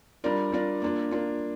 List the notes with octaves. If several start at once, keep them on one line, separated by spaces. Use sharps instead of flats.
G3 D4 F4 A#4 D5
G3 D4 F4 A#4 D5
A#3 D4 F4
A#3 D4 F4